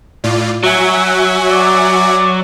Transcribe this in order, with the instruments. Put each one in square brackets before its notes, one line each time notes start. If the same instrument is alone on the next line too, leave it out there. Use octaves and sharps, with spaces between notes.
[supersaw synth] A2 F4 D5
[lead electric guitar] F#3 [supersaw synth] F#4 E5 G#5
[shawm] D5